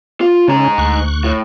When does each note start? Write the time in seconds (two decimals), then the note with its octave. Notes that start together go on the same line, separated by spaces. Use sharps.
0.21 F4
0.48 G#2 C#3 C#4 A#5
0.78 D2 C#6 F#6
1.24 A2